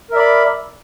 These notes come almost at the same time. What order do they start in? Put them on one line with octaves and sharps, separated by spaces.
A#4 E5 D5 B5